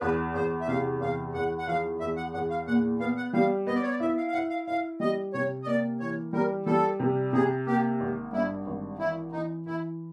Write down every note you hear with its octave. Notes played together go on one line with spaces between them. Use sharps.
E2 B4
E2 C5
E5
C3 F5
E2 F5
E2 F#5
F#5
F3 F5
E2 E5
F#5
E2 F#5
F5
A#2 F#5
B3 F5
F#5
G3 F5
B3 D#5
D5
C#5
D5
E4 E5
F5
F5
E4 F#5
F5
E4 F5
G3 D#5
C3 C#5
D#5
A#3 D5
E3 C#5
G3 A#4
G3 A4
C3
C3 G#4
A#3 G4
G#1
G2 E4
G#1
E3 E4
E3 D#4
E3 E4